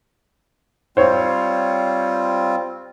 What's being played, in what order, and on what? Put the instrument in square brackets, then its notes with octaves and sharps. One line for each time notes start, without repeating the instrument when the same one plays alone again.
[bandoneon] G3 C4 F4 [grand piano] C5 C#5